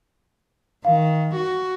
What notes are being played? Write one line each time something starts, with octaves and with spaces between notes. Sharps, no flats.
D#3 F5
F#4